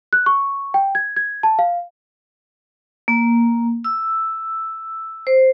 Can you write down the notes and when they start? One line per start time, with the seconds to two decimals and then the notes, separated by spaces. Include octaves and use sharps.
0.13 F#6
0.26 C#6
0.74 G5
0.95 G#6
1.16 G#6
1.43 A5
1.59 F5
3.08 A#3
3.84 E6
5.27 C5